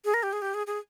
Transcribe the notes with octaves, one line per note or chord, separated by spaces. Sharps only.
G#4
A#4
G4
G#4
G4
G#4
G#4